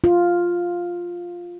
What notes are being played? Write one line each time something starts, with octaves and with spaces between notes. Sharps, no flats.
F4